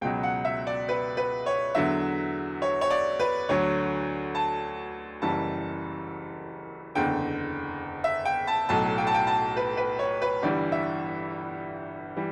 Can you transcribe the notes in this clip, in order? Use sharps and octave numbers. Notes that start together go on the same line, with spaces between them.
C#2 B2 F#3 G5
F#5
E5
D5
B4
B4
C#5
E2 D3 F#3 E5
C#5
C#5
D5
B4
D2 D3 F#3 C#5
A5
F#1 F#2 E3 G3 A5
F#1 E2 D3 G5
E5
G5
A5
B1 A2 F#3 A5
G5
A5
G5
A5
B4
B4
C#5
B4
G1 G2 E3 G3 D5
E5
E3 G3